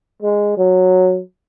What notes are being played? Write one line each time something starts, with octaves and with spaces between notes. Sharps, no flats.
G#3
F#3